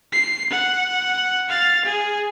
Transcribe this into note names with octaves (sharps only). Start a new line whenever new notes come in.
C7
F#5
F5 A6
G#4